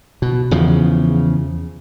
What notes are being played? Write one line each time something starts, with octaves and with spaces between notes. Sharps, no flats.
B2
E2 C#3 F3